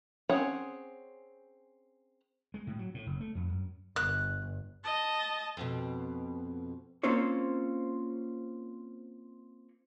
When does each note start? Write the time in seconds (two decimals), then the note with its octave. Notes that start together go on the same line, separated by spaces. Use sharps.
0.29 C4 C#4 G#4 C#5 F#5
2.54 G#3
2.67 A2
2.79 F#3
2.94 A2
3.06 F#1
3.21 A3
3.35 F2
3.50 F#2
3.96 G1 F#6
4.84 D#5 A5
5.57 F2 B2
7.03 A#3 C4 C#4 F4 C5 C#5